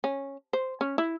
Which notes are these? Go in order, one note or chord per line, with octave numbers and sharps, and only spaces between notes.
C#4
C5
C#4
E4